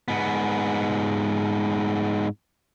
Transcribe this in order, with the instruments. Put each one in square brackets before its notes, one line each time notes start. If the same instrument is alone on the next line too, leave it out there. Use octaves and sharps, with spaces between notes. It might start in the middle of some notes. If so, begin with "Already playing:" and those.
[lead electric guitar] G#2 B3